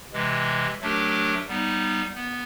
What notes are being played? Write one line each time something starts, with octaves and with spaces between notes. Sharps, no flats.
C3 E3 G#3
F#3 A3 D4 G4 A#4
G3 B3 D#4
B3